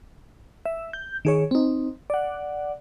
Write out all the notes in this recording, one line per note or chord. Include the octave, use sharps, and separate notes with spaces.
E5
G6
D#3 G#4 C#5
C4 D#4
D5 F#5